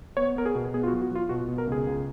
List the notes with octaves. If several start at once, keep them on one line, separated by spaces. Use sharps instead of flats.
B3 C#5
B3 A#4
G#4
B2
B3 G#4
F4
F#4
F#3
F#4
F#3 F4
B2 F#4
B2
A#4
C#2 G#4
C#2